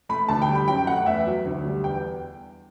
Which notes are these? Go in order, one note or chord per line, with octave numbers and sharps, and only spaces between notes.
A3 B5
D2 A5
G5
G3
B5
F#2 G5
A3 F#5
E2 E5
F#3
D2
G3
E2 G5